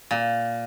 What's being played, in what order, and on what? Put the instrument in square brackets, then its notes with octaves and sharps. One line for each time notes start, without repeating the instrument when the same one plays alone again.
[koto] A#2